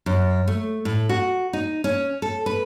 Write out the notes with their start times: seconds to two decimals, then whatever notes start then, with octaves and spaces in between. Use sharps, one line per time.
0.06 F#2
0.48 A3
0.85 A2
1.09 F#4
1.53 D#4
1.84 C#4
2.22 A4
2.46 B4